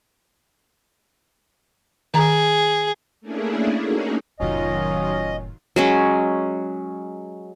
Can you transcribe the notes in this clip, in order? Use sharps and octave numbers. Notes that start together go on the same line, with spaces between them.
D#3 G#4 A#5
A3 A#3 C#4 D4 E4 G#4
A3 A#3 C#4 D#4 F#4 G#4
F1 A2 D#3 F#3 C#4 F4 D#5
F#3 G#3 C#4